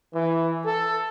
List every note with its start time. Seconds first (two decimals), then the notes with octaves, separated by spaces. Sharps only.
0.14 E3
0.66 A4